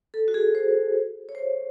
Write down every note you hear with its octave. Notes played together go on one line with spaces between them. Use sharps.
A4
F#4
G#4
C5
C#5
C5